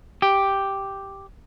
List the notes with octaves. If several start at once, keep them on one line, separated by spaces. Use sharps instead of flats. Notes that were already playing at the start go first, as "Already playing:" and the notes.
G4